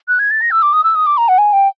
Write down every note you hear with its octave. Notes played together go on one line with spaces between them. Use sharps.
F#6
G#6
A6
A#6
E6
D6
D#6
E6
D#6
D6
A#5
F#5
G#5
G5